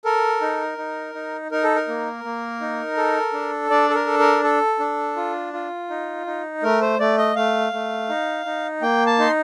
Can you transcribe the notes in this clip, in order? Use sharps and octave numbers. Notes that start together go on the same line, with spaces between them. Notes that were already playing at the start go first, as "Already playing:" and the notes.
A4 A#4
D#4
D#4
D#4
D#4 A#4
A4
A#4
A#3
A#3
D#4
A4
D4
D4 D5
A4
A#4
A4
A#4
A4
D4
F4
F4
D#4
D#4
A3 A#4
C5
A3 D5
D#5
A3 F5
A3
D#4
D#4
A#3 G5
A5
D#4 C6